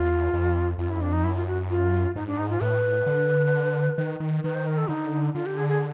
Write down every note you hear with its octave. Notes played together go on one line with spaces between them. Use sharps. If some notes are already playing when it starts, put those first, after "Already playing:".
Already playing: E2 F4
F2
F2 F4
F#2 E4
F2 D4
D#4
F#2 E4
F4
F#4
F4
G#2 D#4
D4
D#4
F4
A2 B4
D3
D#3
D#3
D#3 B4
C5
A#4
A4
D3 D#4
D3 F4
G4
G#4
G#4